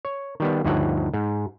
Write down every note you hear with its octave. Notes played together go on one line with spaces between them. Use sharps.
C#5
D#3 G3 B3
D2 G2 F3 D#4 C#5 F#5
G#2